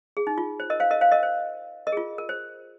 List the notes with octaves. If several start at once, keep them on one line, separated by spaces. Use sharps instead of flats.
G#4
D#4
F4
C5
A#4 D#5
C5 F5
A#4 D#5
C5 F5
A#4 D#5
C5
A#4 D#5
G#4
F4
A#4
C5